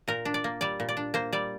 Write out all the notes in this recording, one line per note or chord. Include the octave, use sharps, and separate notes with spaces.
A#2 A#4
D4
D5
A#3
G3 D5
A#2
D5
D4
A#3 C5
G3 D5